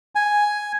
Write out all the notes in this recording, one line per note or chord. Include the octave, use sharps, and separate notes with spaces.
G#5